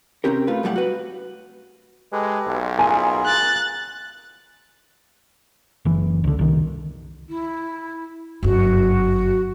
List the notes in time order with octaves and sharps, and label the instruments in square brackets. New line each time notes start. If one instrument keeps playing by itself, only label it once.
[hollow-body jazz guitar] C3 G#3 C4 C#4 G4 A#4
A3 F4 B4
F#2 A2 G3 G#4 F#5
F#4 B4
[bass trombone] G#3 [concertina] G4 A4 B4
[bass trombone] B1
[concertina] F4 G#4 A#4 [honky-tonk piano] G#5
[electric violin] F#6 A6
[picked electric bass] F#1 E3
C#2 D3
C2 D#3
[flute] E4
[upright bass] G1 F#2 [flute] F#4